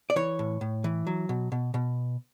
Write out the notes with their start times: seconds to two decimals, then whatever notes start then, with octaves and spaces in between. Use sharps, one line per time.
0.10 D5
0.16 E3 C#5
0.39 A2
0.61 A2
0.84 E3
1.07 F#3
1.29 B2
1.52 B2
1.74 B2